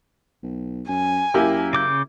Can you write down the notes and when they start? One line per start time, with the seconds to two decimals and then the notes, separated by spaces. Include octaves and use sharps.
0.43 B1
0.88 F#2 G#5
1.34 F#2 A#3 E4 G4
1.73 C#3 D6 G6